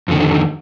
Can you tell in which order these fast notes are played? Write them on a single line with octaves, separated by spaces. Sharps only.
F2 D3 D#3